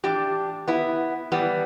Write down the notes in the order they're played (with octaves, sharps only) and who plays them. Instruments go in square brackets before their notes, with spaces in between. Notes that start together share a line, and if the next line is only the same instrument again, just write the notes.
[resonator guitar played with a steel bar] A2 E3 D4 G4
B3 E4
A2 E3 G3 B3